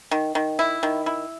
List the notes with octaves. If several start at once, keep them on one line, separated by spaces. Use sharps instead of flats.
D#3
D#3
E4
D#3
E4